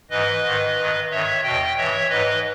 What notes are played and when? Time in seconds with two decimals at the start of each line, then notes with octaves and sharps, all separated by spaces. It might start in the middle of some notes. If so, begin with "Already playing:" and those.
0.10 G#2 E3 B4 D#5
0.44 G#2 D#3
0.77 G2 D#3
1.10 G2 D#3 C#5 E5
1.43 E2 B2 D#5 G5
1.77 G2 E3 C#5 E5
2.10 G#2 E3 B4 D#5